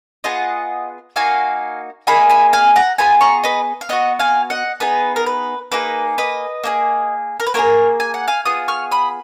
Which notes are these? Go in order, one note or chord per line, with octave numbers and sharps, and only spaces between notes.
B3 F4 G#4 D#5 F#5
A#3 D#4 F#4 F5 G#5
A#3 D#4 G#4 G#5 B5
G#5 B5
F5 G#5
F#5 A#5
B3 F4 G#4 G#5 B5
A#5 C#6
B4 D#5
F5
B3 F#4 D#5 F#5
F5 G#5
D#5 F#5
B3 D#4 G#4 B4
A#4
B4
A#3 D#4 G#4 B4
B4 D#5
A#3 D#4 G#4
A#4
B4
A#3 F4 G#4 A#4 C#5
G#5
F#5
F5 G#5
B3 F4 G#4 D#6
C#6 F6
B5 D#6